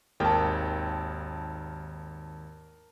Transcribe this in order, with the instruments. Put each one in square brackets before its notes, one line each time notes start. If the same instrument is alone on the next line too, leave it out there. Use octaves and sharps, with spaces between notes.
[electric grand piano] G#1 D#2 G5 [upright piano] A#4 A5